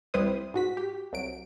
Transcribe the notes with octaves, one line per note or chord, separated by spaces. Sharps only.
C2 G3 E4 B4 C5 D#6
G#2 F#4 B6
G4
C2 F#3 D7